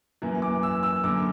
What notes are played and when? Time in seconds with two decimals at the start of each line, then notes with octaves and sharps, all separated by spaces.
0.22 F#2 E3 A#3
0.42 D6
0.63 E6
0.83 E6
1.04 F#2 D3 A#3 D6